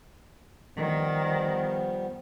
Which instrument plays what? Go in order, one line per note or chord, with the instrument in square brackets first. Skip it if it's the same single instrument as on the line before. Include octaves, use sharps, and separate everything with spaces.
[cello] D#3 [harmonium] F3 G3 B3